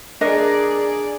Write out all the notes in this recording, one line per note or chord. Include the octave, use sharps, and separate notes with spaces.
D4 G#4 A#4 D5 D#5